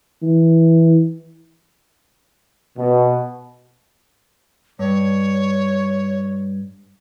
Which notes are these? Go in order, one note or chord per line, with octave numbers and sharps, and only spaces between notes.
E3
B2
G2 C#5